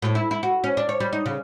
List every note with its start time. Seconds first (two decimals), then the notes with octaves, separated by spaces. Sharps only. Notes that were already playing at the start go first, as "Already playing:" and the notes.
0.02 A2
0.15 E4
0.31 E4
0.43 F#4
0.64 C#4
0.77 D4
0.89 C#5
1.00 G3
1.13 D#4
1.26 C#3